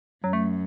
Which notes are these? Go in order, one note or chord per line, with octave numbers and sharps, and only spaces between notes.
F#2 F#3
A3